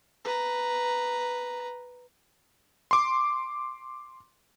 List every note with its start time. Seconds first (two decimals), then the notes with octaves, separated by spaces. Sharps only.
0.25 B4 A#5
2.91 C6 D6